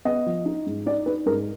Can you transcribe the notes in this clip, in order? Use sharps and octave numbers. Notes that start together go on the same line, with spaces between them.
B3 D#5
F3
D#4
G#2
D#4 D5
D#4 B4
G#2 A#4